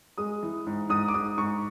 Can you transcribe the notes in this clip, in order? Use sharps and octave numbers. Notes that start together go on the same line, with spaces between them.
G#3 D#6
E3
G#2
G#2 D#6
D6
G#2 D#6
G#2 C#6